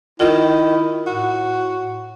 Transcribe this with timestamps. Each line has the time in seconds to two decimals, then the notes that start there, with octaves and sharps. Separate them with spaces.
0.20 D#3 E4 F4
1.07 A2 F#4